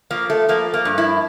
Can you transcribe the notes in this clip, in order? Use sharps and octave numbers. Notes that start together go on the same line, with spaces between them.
F3 A#3
A3
F3 A#3
A#3
G2
E4